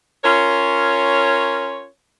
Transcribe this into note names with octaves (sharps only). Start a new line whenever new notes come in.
C#4 F4 A#4 C#5